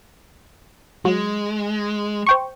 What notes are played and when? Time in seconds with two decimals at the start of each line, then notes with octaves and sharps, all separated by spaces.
1.05 F#3 G#3
2.27 C5 G5 C#6